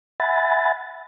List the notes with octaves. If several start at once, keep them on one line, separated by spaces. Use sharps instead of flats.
E5 F#5 G#5 B5 A6